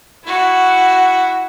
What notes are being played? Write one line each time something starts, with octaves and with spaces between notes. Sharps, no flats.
E4 F#4